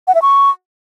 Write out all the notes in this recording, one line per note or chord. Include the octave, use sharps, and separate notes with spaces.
F#5
E5
C#6